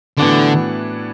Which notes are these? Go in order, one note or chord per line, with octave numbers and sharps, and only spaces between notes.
A2 D3 E3 B3 D4 F#4